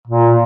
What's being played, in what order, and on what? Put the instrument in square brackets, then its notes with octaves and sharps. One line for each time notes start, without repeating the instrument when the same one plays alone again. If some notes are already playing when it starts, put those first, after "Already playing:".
[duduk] A#2